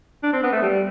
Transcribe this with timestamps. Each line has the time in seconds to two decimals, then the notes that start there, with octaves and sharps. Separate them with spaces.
0.23 D4
0.33 C4
0.43 B3
0.52 A3
0.63 G3